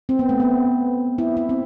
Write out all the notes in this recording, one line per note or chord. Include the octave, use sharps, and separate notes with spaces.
C4
B3
A3
B3
E4
E4
C4